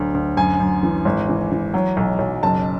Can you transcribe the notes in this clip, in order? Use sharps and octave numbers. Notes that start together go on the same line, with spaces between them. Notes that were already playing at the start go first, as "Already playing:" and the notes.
Already playing: D2 F#3
D2
F#2 G#5
F#2
E3
G#1
E3
E3
F#3
B1
B1
F#1 A5